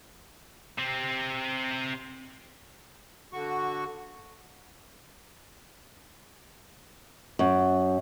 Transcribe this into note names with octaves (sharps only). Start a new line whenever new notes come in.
C3 C4
D3 F#4 C#6
F#2